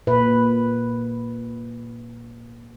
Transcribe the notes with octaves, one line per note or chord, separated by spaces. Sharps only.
A#2 B4